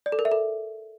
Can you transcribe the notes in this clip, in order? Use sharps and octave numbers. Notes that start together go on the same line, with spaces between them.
D5
A4
A#4
E5
A4